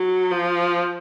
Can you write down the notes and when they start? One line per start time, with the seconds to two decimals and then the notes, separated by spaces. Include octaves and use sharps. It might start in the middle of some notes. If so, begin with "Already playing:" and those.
Already playing: F#3
0.31 F3